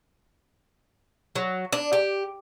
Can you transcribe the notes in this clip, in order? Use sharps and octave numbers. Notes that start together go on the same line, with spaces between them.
F#3
D4
G4